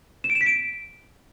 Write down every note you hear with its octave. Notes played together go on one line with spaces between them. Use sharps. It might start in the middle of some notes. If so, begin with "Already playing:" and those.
E7
D7
E7
B6
D7